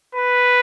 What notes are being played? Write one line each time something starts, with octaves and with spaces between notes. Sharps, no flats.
B4